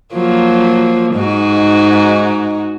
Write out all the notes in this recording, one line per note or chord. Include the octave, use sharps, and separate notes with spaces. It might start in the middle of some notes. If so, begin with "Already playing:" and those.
F3 F#3 A#3
G#2 D#4 F#4